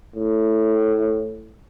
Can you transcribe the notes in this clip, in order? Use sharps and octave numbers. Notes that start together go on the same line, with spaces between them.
A2